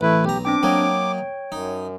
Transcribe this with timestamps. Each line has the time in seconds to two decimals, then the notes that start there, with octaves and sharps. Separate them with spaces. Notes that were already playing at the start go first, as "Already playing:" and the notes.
0.01 A1 A3 E4 B4
0.25 B1 G4 A#5
0.45 C4 D4 G5 D6
0.63 F#3 A#3 C#5 D#5 G5
1.52 F#2 D#4